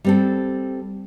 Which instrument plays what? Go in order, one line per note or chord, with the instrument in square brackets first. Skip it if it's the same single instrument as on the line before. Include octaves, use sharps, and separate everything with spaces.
[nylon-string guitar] G3 C4 A4